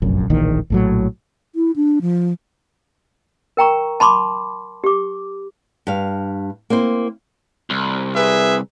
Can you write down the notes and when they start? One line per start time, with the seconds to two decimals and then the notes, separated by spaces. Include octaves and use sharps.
0.02 F1 A#1 F#2
0.30 D1 A#1 D#3 E3
0.70 A#1 A2 F#3
1.55 E4
1.76 D4
2.01 F3
3.57 A#4 G5 A#5 C#6
4.00 A5 B5 C6 D6
4.84 G4 D6
5.87 G2 F5
6.70 A#3 C4 E4 C5
7.70 C2
8.15 G#4 B4 E5